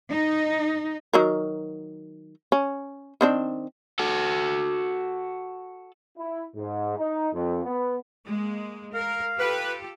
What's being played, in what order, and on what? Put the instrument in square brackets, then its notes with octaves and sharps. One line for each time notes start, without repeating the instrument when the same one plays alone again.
[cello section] D#4
[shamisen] D#3 F#3 A#4
C#4
D#3 C4 D4
[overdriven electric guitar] F#4 A4
[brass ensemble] E4
G#2
D#4
F2
B3
[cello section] G#3 A#3
[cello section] A#4 [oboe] F5
[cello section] F4 G4 A4 [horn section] B4